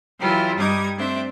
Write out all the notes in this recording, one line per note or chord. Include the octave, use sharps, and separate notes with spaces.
E3 F#3 E4 F4 G4
G2 G3 D#4 D6 D#6 G#6
A3 C4 D4 C5 D5 E5